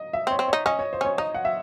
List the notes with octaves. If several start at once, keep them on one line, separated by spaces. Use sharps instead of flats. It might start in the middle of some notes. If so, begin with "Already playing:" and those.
Already playing: D#5
E5
C4
C#5
C4
D#4 C#5
C#4 D#5
C#5
C5
C#4 C#5
D#4 D#5
F#5
E5